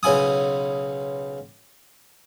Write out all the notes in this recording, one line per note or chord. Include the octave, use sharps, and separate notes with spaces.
B1 C#3 E4 G#5 D#6